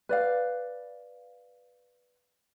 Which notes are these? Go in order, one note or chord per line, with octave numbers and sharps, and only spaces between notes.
B4 D5 F5